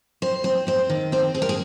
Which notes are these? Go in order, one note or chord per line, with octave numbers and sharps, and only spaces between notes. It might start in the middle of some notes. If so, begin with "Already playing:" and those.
C4 C5
C4 C5
C4 C5
D#3
C4 C5
C4 G#4
A#4
G#4